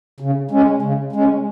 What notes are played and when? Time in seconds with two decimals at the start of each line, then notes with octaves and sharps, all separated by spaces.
0.20 C#3
0.51 G#3 C#4
0.82 C#3
1.13 G#3 C#4